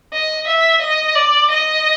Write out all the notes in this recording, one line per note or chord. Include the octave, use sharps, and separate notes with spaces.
D#5
E5
D#5
D5
D#5